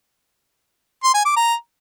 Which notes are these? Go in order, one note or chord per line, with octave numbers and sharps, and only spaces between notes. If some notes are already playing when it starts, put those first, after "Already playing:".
C6
G#5
D6
A#5